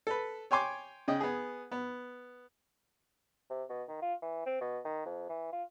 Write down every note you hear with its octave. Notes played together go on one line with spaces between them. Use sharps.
A4 B4
C#5 G5 G#5 C6 D6
C#3 D#5 G5
B3 G#4
B3
C3
B2
D#3
F4
E3
C4
B2
D#3
F2
E3
F4